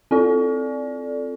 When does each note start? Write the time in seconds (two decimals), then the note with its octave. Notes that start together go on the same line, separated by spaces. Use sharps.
0.11 C4 F4 A4 D5